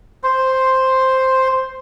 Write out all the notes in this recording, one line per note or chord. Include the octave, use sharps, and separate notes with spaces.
C5 C6